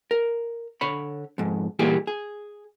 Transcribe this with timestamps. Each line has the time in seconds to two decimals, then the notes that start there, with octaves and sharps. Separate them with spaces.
0.11 A#4
0.81 D3 C#5 B5
1.38 F2 G#2
1.79 A#2 E3 G3 A#3 G4 G#4
2.07 G#4